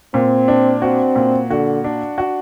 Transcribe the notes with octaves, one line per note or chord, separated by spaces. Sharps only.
A#2 C4
D4
C4 F#4
A#2
D3 F#4
D4
F#4